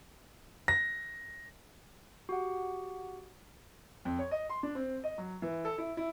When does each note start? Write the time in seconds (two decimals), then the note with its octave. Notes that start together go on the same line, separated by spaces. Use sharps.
0.68 A#6
2.29 F#4 G4 F#5
4.05 F2
4.19 C#5
4.31 D#5
4.50 C6
4.63 D4
4.75 C4
5.04 D#5
5.18 F#3
5.42 E3
5.65 A4
5.78 E4
5.97 E4